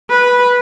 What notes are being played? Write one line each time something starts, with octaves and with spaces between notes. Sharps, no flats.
B4